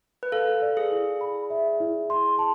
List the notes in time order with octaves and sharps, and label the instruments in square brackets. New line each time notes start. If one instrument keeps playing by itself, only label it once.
[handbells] B4
[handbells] A4 [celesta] F5
[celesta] D5
[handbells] G#4
[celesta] E4
B5
E5
E4
C6
A5